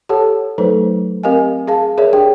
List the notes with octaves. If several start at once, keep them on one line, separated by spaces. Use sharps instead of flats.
G4 A4 C#5 F#5 A5
F#3 A3 D#4 A4 B4 C5
C4 G4 A#4 D#5 F5 G#5
G#4 F5 A5
G#4 A#4 C#5 D5 E5
D4 G4 G#4 G5